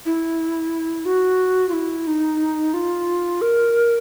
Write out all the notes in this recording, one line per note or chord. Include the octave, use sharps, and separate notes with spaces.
E4
F#4
F4
E4
D#4
F4
A#4